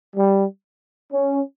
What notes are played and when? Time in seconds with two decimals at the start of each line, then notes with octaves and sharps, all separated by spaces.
0.15 G3
1.11 C#4